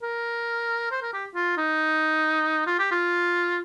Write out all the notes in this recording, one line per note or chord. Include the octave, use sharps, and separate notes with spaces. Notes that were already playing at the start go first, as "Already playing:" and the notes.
A#4
C5
A#4
G4
F4
D#4
F4
G4
F4